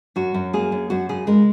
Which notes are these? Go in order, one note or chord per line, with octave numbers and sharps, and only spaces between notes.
F#2 F#4
F#2
A#3 G#4
F#2
F#2 F#4
C#3 G#4
G#3 A#4